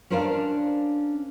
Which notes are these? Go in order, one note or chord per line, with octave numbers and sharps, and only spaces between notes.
C#4 D4 A#4 C5 D5 F5